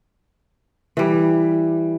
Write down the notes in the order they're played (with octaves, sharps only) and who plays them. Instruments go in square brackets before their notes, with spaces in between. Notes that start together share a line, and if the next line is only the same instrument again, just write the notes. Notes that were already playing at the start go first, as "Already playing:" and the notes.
[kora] E3 G3